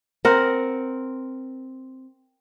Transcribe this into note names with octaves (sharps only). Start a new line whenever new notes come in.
C4 A#4 F#5